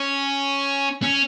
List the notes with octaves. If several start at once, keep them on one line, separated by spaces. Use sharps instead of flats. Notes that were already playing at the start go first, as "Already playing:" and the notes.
Already playing: C#4
C#4